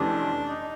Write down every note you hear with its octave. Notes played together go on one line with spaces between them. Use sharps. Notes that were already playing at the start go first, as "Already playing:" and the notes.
Already playing: F2 C3 E3 A3 C#4 D4
D#4